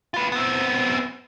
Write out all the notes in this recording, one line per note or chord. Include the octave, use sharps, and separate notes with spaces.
F4 B4
B3 C4